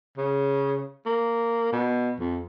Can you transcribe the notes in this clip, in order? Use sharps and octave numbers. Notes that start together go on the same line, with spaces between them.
C#3
A#3
B2
F2